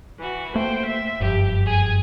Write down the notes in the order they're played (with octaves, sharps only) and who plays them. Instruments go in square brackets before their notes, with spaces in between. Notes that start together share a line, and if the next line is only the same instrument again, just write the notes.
[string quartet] E3 F#4
[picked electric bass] A3 A#3 [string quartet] C5 G5
[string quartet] E5
[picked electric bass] F#1 G2 F3 [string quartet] G4
[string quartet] G#4 G#5